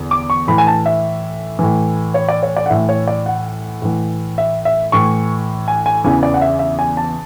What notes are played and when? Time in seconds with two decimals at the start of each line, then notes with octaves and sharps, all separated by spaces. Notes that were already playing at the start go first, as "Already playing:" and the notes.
Already playing: E2 D3
0.11 D6
0.30 C#6
0.47 A2 E3 B5
0.58 G#5
0.67 A5
0.86 E5
1.59 A2 E3
2.14 C#5
2.28 D5
2.43 C#5
2.56 D5
2.66 F#5
2.70 A2 E3 E5
2.89 C#5
3.07 D5
3.26 F#5
3.82 A2 E3
4.38 E5
4.65 E5
4.92 A2 E3 C#6
5.68 G#5
5.86 G#5
6.04 E2 C#3 E3 G#5
6.23 D5
6.34 F#5
6.41 E5
6.59 E5
6.79 G#5
6.97 A5